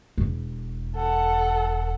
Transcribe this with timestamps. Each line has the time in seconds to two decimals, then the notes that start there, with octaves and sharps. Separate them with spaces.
0.18 E1
0.96 A4 F#5